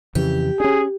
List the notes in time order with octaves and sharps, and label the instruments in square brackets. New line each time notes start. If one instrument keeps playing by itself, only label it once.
[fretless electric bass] F2 C#3 E3 [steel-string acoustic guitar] G4
[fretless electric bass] C#4 D4 [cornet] G#4